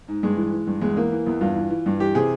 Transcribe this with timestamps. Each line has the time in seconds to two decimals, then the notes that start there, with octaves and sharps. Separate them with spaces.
0.08 G#2
0.23 G2 G#3
0.37 E3
0.52 E3
0.67 G2
0.81 E2 G#3
0.97 E3 A#3
1.12 E3
1.27 E2
1.41 G2 F4
1.56 E3
1.70 E3
1.86 G2
2.00 E3 G4
2.15 C3 G#4